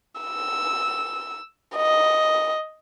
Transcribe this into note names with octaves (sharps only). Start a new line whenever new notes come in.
E6
D#5